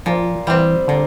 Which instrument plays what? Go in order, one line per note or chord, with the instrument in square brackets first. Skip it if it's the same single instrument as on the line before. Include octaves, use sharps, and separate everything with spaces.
[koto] A#2 [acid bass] F3
[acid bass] E3 [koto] G3 C4
[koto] A#2 [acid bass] D3